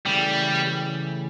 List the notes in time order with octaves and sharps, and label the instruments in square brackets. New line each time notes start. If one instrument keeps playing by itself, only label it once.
[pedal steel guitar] C#3 E3 A3 [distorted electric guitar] G3